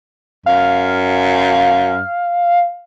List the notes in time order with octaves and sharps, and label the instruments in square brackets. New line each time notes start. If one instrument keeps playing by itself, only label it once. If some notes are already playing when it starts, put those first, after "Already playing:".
[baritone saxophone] F#2 [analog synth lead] F5